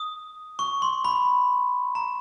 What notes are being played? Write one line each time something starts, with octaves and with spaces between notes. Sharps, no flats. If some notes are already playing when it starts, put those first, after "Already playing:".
Already playing: D#6
C#6
C6
B5
A#5